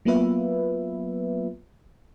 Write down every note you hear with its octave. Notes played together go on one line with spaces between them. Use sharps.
F#3 A#3 B3 F4 B4 E5